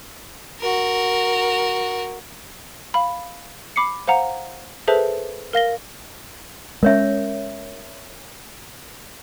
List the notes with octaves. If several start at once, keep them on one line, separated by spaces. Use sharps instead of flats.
F#4 A#4
F5 B5
B5 D6 C7 C#7
C5 F5 F#5 A#5
G#4 A4 B4 C5 E5 A5
A#4 F5 A#6 G7
G#3 C#4 A#4 C#5 E5